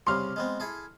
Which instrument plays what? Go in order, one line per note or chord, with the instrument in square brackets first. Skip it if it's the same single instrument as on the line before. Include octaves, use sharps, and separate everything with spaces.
[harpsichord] C2 C#3 G3 [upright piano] C6 F6
[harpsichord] G#3 B3 C4
E4 G#4 A4